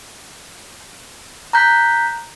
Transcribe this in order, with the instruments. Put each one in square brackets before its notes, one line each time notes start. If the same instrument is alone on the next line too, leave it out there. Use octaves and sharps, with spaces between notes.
[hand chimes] A#5 F#6 G6 B6